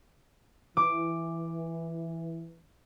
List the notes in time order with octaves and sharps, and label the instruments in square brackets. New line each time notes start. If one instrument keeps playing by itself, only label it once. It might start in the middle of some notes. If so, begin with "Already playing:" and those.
[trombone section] E3 [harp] D6